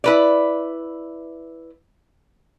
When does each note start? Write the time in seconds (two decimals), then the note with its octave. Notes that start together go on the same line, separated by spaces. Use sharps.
0.04 E4 B4 D5